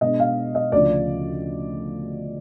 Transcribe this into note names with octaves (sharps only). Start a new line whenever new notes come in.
B2 G#3 B3 D4 D#5
F5
D#5
D2 C#3 F3 D5